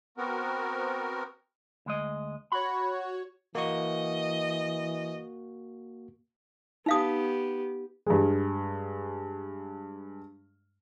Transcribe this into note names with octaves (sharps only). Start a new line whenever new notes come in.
B3 C4 F#4 A#4
D2 G#3 D#5
F#4 C#5 B5
E3 A#3 F#4 D#5 C#6
B3 D#4 G4 F5 D#6
G2 G#3